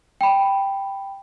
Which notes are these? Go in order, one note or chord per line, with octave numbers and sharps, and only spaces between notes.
G5 B5